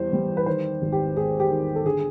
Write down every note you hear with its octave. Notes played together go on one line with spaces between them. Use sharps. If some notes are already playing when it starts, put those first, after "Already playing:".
Already playing: E2 G3 C5
G3
B4
D#3 C5
G#1
G4
G#2 G#4
G4
D#3
A4
D3 G#4